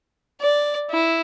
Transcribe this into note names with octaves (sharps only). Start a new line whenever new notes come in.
D5
E4